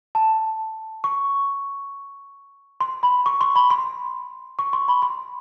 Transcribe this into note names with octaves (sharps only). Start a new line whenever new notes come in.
A5
C#6
C6
B5
C#6
C6
B5
C6
C#6
C6
B5
C6